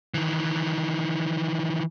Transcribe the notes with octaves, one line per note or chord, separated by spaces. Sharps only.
D#3 E3